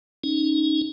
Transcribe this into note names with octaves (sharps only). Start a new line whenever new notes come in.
C#4 D#4